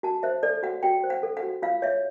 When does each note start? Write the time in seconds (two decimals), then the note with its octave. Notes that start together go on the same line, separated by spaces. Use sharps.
0.03 F#4 A5
0.23 C5 E5
0.43 A4 D5
0.63 F#4 F#5
0.83 F#4 G5
1.04 C5
1.10 F#5
1.23 A4
1.37 F#5
1.43 F#4
1.62 F4 F5
1.82 C#5 E5